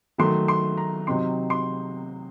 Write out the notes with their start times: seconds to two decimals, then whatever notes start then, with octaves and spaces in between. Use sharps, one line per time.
0.18 D#3 F#3 A3 C6
0.48 C6
0.77 A#5
1.07 C3 F#3 C4 D#4 C6
1.50 C6